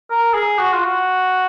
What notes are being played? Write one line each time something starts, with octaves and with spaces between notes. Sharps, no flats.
A#4
G#4
F#4
F4
F#4